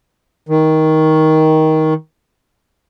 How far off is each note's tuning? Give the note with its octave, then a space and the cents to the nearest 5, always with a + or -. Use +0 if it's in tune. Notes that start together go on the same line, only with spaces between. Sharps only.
D#3 +15